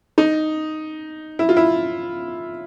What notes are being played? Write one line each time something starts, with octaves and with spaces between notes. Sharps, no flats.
D#4
E4
F4
E4